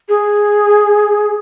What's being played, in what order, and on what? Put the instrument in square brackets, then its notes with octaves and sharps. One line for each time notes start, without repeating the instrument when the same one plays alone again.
[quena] G#4